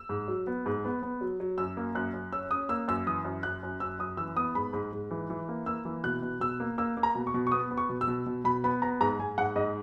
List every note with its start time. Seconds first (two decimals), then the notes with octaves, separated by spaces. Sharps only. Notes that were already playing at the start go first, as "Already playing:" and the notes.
Already playing: E6
0.09 G#2
0.28 F#3
0.47 B3
0.66 G#2
0.84 B3
1.02 B3
1.21 F#3
1.40 F#3
1.58 F#2 E6
1.77 A#3
1.95 F#2 F#6
2.14 F#2
2.32 C#4 E6
2.51 C#4 D#6
2.69 A#3 E6
2.88 F#2 E6
3.06 E3 D#6
3.25 F#2
3.43 F#2 F#6
3.63 F#2
3.80 F#2 E6
3.99 F#2 D#6
4.17 E3 E6
4.36 B3 D#6
4.55 G#2 B5
4.73 G#2
4.92 G#2
5.11 E3
5.30 E3
5.48 A#3
5.66 A#3 E6
5.85 E3
6.04 B2 F#6
6.22 B2
6.40 B2 E6
6.60 A#3
6.78 A#3 E6
6.97 A#3
7.03 A#5
7.15 B2
7.27 C#6
7.34 B2
7.47 C#6
7.52 B3 D#6
7.71 B3
7.77 C#6
7.89 B2
8.01 E6
8.07 B2
8.26 B2
8.44 B2 B5
8.64 B3 B5
8.82 B3 A#5
9.01 G#2 A#5
9.19 G#2 G#5
9.38 G#2 F#5
9.56 G#2 D#5